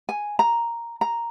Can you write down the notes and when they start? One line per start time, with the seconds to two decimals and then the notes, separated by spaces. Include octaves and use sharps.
0.09 G#5
0.39 A#5
1.01 A#5